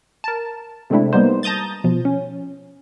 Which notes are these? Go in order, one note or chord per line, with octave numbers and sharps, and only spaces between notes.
A#4 A5
C3 G#3 A3 C4 D4 E4
G3 A#3 B3 D#4 C5
A5 A#5 D#6 G6 A6
B2 F3
C#4